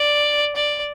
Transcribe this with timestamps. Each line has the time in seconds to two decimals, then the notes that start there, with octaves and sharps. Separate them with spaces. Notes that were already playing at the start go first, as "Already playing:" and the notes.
Already playing: D5
0.56 D5